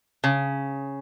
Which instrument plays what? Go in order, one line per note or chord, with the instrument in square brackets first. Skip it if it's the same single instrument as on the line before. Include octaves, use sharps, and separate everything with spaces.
[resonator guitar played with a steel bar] C#3